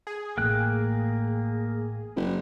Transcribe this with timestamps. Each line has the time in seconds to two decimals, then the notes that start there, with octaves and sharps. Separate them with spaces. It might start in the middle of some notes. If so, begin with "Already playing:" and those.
0.07 G#4
0.37 A1 A2 A#3 G5 F#6
2.16 F#1